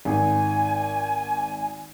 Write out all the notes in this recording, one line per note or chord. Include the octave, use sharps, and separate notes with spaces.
G#1 G#5